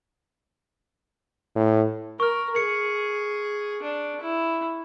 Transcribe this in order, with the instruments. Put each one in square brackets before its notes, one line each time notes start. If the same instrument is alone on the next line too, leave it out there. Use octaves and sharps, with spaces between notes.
[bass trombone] A2
[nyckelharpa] A#4 [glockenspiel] C#6 F6
[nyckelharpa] G#4 [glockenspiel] C#7
[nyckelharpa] D4
E4